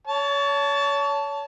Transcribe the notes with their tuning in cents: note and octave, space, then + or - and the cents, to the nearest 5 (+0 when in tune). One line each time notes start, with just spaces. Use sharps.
C#5 +30 A5 +0